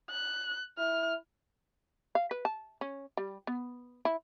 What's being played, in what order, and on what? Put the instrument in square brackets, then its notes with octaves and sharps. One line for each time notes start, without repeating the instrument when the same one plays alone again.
[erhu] F#6
[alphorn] E4 [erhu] F6
[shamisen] F5
B4
A5
C#4
G3
B3
E4